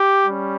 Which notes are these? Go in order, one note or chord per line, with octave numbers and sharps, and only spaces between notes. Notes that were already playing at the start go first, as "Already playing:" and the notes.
Already playing: G4
G3 C#4